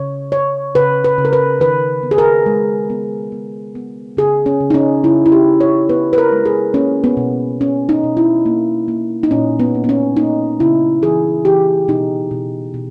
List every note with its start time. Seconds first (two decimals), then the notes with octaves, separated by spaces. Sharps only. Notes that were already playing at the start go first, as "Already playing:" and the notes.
Already playing: C#3 C#5
0.32 C#3 C#5
0.75 C#3 B4
1.04 B4
1.18 C#3
1.25 A#4
1.33 B4
1.60 D#3 B4
2.03 B3
2.11 G#4
2.18 A#4
2.46 G#3
2.90 B3
3.32 B3
3.75 B3
4.17 C#3 G#4
4.46 C#4
4.60 C#3
4.70 D#4
4.74 C#4
5.03 C#3 E4
5.26 E4
5.32 G4
5.46 C#3
5.61 C#5
5.89 B3 B4
6.13 B4
6.18 A#4
6.32 G#3
6.46 G#4
6.74 A#3 C#4
7.04 B3
7.17 B2
7.60 B2 C#4
7.89 D#4
8.04 B2
8.17 E4
8.46 A#3
8.88 A#3
9.23 D#4
9.31 A#2 C#4
9.59 B3
9.75 A#3
9.84 B3
9.89 C#4
10.17 A#3 D#4
10.60 C#3 E4
11.02 E3 G#4
11.45 E3 G4
11.88 B2 D#4
12.31 B2
12.74 B2